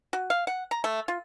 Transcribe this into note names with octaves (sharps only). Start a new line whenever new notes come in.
F#4
F5
F#5
A#5
A3
F4